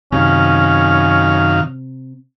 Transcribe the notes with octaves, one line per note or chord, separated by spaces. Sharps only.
F#2 C3 D#3 C#4 F5